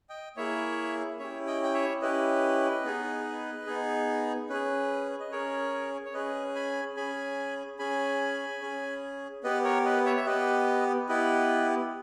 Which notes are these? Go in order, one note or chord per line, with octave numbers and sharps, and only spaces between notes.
D#5 G5
A#3 E4 G#4 C#5 E5
C#4 E4 G4 C#5 E5
D#5 G5
G5
C#5 E5
C#4 E4 G4 B4 D#5
B3 D#4 G#4
B3 D#4 G#4
C#4 G#4 B4
D#5
C#4 G#4 A#4 C#5
C#5
C#4 G#4 B4 D#5
G#5 B5
C#4 G#4 G#5 B5
C#4 G#4 G#5 B5
C#4 G#4
B3 G4 B4 D#5
A#4 C#5
B4 D#5
C#5 E5
E5
B3 G4 B4 D#5
B3 E4 G4 B4 D#5